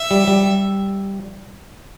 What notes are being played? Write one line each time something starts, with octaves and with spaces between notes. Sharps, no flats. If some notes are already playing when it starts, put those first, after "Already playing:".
Already playing: E5
G3
G3